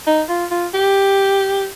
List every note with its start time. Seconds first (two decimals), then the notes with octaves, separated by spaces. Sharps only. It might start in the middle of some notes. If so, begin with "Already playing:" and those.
0.07 D#4
0.29 F4
0.51 F4
0.74 G4